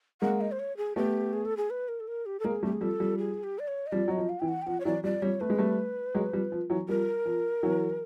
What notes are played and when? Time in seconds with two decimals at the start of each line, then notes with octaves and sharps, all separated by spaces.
0.22 G#3 A#3 F#5
0.41 D#5
0.52 C5
0.59 C#5
0.77 G#4
0.96 A3 B3 G4
1.33 G#4
1.45 A4
1.57 G#4
1.70 B4
1.88 A#4
2.00 A4
2.08 A#4
2.26 G4
2.40 A4
2.44 G#3 A#3 G#4
2.63 G3 A3 G4
2.73 G#4
2.81 F3 G3 A4
3.00 F3 G3
3.18 G#4
3.44 G4
3.59 D5
3.68 C#5
3.87 D#5
3.92 F3 G3 D5
4.08 F#3 D#5
4.18 F3
4.29 F5
4.40 E3 G5
4.48 F#5
4.62 G5
4.66 F3 F#5
4.80 C#5
4.85 E3 F#3 D5
5.04 F3 G3 D5
5.22 F3 G3 C#5
5.40 A3 B4
5.50 G#3
5.58 G3 A3
6.15 F#3 G#3
6.33 F3 G3
6.52 F3
6.70 E3 F#3
6.89 F3 G3 A#4
7.26 F3
7.63 E3 F#3